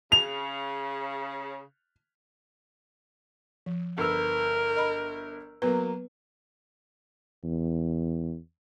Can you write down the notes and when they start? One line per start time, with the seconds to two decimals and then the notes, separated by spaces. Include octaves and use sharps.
0.12 C#3 F7
3.66 F3
3.98 G1 A#4 B4 E6
4.77 D#5 B5
5.62 F#3 A#3 B3 B4
7.44 E2